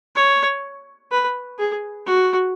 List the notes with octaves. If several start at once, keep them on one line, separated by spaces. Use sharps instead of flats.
C#5
B4
G#4
F#4